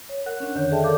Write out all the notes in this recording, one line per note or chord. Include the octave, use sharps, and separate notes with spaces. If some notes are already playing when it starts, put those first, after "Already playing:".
C#5
A#4 F#5 F#6
C#4 D4
F2 D3 D#3 D4 C#5 G6
G#4 A4 D5 E5 G5 A5
A4 A#4 D5 F5 D6 G6